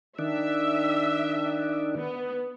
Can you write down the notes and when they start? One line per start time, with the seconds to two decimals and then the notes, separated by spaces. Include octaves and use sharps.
0.19 D#3 D4 E5
1.96 B3